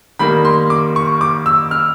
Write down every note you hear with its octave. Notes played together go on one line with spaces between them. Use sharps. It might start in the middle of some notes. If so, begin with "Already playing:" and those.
D#3 G3 A#3 B5
C6
D6
C#6
D6
E6
F6